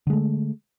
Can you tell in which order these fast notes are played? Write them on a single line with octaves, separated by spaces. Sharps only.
D3 G#3 A3